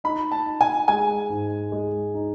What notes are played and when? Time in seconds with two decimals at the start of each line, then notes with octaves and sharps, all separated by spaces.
0.04 D#4 B5
0.32 A5
0.46 D#4
0.61 G#5
0.88 G#3 G#5
1.29 G#2
1.72 G#3
2.14 D#4